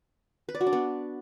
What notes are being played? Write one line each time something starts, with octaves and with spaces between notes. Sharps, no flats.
B4
D5
F#4
D4
B3